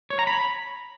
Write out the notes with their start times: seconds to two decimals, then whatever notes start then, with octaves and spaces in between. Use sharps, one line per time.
0.10 C#5
0.19 A#5
0.27 B5